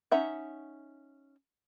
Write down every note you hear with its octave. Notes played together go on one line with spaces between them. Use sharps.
C#4 D#4 E5 F#5